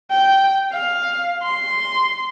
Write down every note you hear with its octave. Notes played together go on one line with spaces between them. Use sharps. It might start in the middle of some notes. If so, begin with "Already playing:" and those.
G5
F5
C6